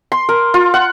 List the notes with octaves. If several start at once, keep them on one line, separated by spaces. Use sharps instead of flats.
C6
A#4
F4
F#5